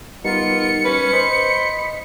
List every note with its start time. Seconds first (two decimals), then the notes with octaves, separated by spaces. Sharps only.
0.25 G3 B3 D#4 F4 A#4 C#7
0.85 C#4 B4
1.13 C5 D#5 B5